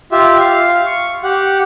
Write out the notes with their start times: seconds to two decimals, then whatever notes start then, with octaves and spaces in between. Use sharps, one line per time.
0.12 F4 G4 E5
0.40 F5
0.87 C#6
1.23 G4 F#5